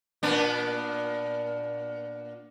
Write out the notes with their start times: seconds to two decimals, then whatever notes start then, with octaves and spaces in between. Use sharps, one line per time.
0.23 A#2 B3 D4